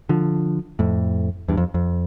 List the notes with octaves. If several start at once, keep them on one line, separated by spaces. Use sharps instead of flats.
D3 F3
F2 A2
E2 G2
F2
F2